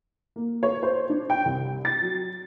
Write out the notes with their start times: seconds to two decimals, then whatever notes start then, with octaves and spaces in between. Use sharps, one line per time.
0.36 A#3
0.63 C#5
0.83 C5
1.10 D4
1.30 G5
1.45 C2
1.85 A6
2.02 F#3